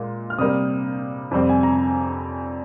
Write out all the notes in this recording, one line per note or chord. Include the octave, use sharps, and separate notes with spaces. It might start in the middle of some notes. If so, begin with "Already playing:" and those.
Already playing: A#2 G#3
F6
C3 G3 A#3 D#6
F2 C3 G3 C4
G#5
A#5